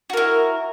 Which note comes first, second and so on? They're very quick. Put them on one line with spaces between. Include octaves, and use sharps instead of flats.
F#4 A#4 E4